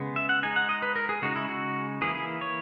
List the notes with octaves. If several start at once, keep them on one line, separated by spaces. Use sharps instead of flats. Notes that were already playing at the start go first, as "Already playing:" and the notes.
Already playing: C#3 G#3 B3
E5
F#5
G#3 D#4 G#5
F#5
D#5
B4
A#4
G#4
C#3 G#3 D#4 F#4
E4
F#4
E3 A#3 E4 G#4
G#4
C#5